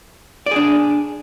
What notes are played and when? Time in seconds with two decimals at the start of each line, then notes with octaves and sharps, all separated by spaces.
0.46 D5
0.51 G#4
0.56 D4